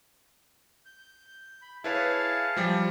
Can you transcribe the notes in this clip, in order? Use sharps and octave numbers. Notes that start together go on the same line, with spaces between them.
G6
B5
E4 G#4 B4 C#5 F5 A5
F3 G3